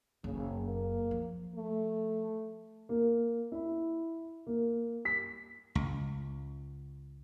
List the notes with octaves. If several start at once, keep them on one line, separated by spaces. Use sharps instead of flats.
F#1 F#2 C#3
A#3
F3
A3
A#3
E4
A#3
B6
C#2